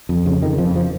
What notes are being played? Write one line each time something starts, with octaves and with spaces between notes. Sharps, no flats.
F2
C#3
F2 D#3
F2 F3
F3